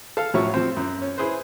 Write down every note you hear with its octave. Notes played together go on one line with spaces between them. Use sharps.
A4 F5
A2 F3 F#3 C#4 E5 C#6
F3 C4
F#2
C#4
E4 G#4 B4 C5